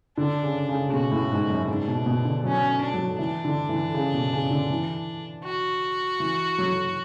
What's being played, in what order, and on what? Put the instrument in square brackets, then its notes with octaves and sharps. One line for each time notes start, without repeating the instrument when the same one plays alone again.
[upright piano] D3 [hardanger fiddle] D4
[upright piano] C#3
C#3
C#3
[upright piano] B2 [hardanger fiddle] F#4
[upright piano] A2
G#2
F#2
[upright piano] G#2 [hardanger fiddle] D4
[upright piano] B2
B2
D3
[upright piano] F#3 [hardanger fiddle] C#4
[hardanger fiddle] D4
[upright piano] F#3
[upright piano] E3 [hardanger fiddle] D4
[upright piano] D3
E3
C#3
B2
C#3
D3
E3
[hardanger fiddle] F#4
[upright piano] E3
F#3